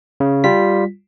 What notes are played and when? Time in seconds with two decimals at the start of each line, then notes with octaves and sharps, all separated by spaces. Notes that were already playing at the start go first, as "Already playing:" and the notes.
0.20 C#3
0.44 G3 F4 B6